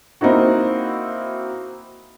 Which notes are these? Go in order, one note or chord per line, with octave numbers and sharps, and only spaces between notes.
A#3 C4 D#4 E4 F#4